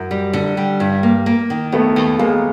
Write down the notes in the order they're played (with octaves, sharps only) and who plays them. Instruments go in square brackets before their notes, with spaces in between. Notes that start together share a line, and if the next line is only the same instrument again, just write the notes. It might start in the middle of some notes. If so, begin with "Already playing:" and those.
Already playing: [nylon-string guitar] F#2
G3
D3
G3
G2
A#3
A#3
D#3
[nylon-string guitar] D#2 [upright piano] A3 B3
[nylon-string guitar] D#2
[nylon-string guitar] D#2 [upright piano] G#3 A#3